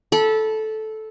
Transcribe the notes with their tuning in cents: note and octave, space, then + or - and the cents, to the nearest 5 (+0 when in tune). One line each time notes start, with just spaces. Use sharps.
A4 -10 B5 -25